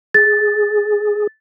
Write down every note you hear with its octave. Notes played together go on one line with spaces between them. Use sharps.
G#4 A6